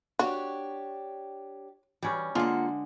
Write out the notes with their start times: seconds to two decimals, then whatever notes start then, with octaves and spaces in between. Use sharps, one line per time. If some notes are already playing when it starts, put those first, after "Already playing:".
0.19 D4 F#4 G4 C#5
2.03 E3 G3 C#4
2.35 D3 G#3 A#3 F4 F#5